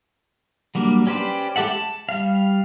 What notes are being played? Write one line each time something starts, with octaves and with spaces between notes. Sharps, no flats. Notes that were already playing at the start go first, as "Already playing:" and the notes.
F#3 G3 A#3 D4
C#4 G4 B4 C5 D5
G#3 G4 A4 E5 F#5
A5
G3 F5